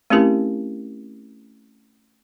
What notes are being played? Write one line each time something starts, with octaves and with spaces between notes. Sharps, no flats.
A3 C4 C#4 E4 G4 A#4